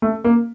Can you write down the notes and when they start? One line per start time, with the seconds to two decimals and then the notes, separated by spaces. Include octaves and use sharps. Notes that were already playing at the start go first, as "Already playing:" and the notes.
0.02 A3
0.24 A#3